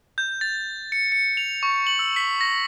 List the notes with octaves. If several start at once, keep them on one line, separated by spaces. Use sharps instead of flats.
G6
A6
C#7
C#7
F7
C#6
F#7
E6
B6
A#6